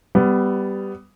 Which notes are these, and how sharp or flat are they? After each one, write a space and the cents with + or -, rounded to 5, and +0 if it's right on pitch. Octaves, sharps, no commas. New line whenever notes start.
G3 +0 B3 +15